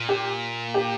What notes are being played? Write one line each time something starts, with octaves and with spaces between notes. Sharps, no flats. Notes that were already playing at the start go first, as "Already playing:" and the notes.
Already playing: A#2
G4
G4